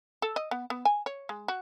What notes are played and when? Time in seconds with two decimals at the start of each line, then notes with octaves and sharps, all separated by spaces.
0.22 A4
0.36 D#5
0.51 B3
0.70 B3
0.85 G#5
1.06 C#5
1.29 G#3
1.48 F#4